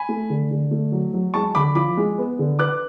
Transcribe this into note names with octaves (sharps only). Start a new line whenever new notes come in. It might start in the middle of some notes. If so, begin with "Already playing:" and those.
Already playing: G#5 B5
A3
D3
D3
A3
F#3
F#3
G#3 A5 C#6
D3 B5 D6
F3 B5 D6
G#3
B3
D3
B4 D6 F#6